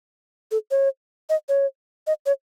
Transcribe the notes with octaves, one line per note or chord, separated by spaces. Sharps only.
A4
C#5
D#5
C#5
D#5
C#5